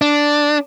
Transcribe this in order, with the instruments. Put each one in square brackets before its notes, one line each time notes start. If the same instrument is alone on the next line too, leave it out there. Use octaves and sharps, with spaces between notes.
[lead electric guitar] D4